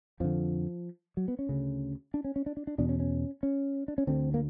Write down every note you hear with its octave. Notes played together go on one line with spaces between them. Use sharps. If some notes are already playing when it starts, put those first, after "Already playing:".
F2 D3 F3
F#3
B3
C#4
D2 C#3
D4
C#4
C#4
D4
D4
D4
E2 B2 D4
C#4
C#4
C#4
D4
C#4
D2 D3 C4
A#3